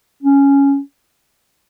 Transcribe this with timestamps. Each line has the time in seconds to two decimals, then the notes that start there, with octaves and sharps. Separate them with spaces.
0.23 C#4